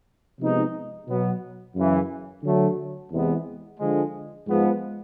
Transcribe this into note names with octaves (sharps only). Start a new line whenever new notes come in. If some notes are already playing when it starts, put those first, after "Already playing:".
C3 F3 G#3 B3 D#4
B2 F#3 B3
F#2 C#3 E3
D3 F#3 A3
E2 C3 E3 G#3 B3
D3 F3 G#3
G#2 F3 G#3 B3